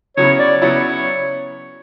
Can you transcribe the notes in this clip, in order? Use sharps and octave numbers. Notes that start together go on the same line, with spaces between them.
C#3 F#3 B3 E4 C#5
D5
C#3 F#3 B3 E4 C#5